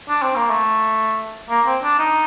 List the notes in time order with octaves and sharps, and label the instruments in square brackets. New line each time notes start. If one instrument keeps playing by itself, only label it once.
[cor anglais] D4
C4
A#3
A3
A#3
C4
D4
D#4